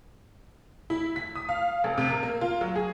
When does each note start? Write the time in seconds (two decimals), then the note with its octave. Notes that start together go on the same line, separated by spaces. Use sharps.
0.90 E4
1.16 B6
1.35 D#6
1.49 F5
1.84 F1
1.98 C3
2.10 A#4
2.23 A#3
2.41 F4
2.61 F#3
2.75 G#4